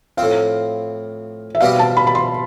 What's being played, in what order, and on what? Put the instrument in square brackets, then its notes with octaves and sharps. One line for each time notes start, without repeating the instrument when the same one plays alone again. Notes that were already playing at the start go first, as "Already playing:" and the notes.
[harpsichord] A2 F3 C4 [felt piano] F5
[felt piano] E5
[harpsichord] B2 G3 C4 G4 [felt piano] F5
[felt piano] A5
B5
B5
C6